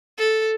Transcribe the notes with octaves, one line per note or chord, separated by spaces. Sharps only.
A4